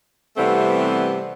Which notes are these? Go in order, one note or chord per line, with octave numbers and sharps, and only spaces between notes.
C3 E3 G3 A3 B3 C4